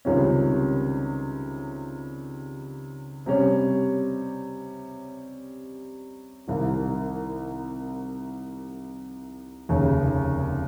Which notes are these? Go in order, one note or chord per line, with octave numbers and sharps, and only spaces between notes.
C#2 C3 D#3 G3 C#4
C3 G3 C#4
C2 C3 D#3
F1 D#2 C#3